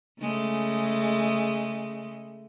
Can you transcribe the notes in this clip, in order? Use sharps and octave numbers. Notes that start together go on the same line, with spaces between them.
C#3 G#3 A3